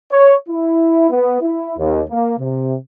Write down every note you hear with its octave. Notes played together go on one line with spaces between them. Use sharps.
C#5
E4
B3
E4
D#2
A#3
C3